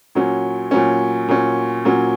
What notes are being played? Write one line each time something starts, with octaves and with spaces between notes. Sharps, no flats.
A#2 F#3 C#4
A#2 F#3 C#4
A#2 F#3 C#4
A#2 F#3 C#4